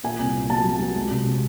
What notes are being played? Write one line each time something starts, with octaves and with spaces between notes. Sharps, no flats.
A#2 G#5
C2
A#2
F#3 A5
F#3
F#3
G#3
C3
C3